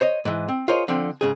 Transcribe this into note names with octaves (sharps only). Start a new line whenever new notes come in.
C5 C#5 D#5
G#2 E3
C4
F4 G#4 A#4 C5 C#5 D#5
D3 F3 C4
G#2 C#3 G#4